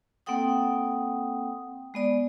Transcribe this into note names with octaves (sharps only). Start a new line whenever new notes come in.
A#3 C4 A4 F#5 G5 D#6
G#3 B3 D5